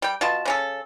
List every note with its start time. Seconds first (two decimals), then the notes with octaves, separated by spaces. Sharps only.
0.02 G3 G5
0.21 B2 F4 A5
0.45 C#3 C#4 A4